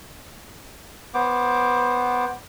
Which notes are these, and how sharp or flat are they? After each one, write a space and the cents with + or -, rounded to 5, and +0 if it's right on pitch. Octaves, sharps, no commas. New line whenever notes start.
B3 +0 C5 +15 D6 +0